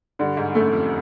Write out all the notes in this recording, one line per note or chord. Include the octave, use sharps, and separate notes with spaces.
G2 D3
G#2
F#2 A3
F2